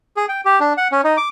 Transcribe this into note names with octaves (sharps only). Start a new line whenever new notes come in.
G#4
G5
G4
D4
F#5
C#4
D#4
D6